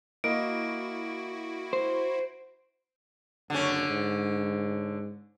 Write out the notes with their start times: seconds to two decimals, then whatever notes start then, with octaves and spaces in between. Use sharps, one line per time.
0.24 A#3 E4 F#4 D#5 D7
1.73 C5
3.50 F#1 D3 C#4
3.89 G#2